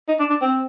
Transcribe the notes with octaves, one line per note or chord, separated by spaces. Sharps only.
D#4
D4
D4
C4